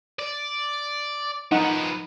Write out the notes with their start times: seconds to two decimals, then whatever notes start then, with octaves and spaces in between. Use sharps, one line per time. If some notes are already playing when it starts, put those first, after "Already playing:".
0.19 D5
1.52 F3 B3 D#4 F#5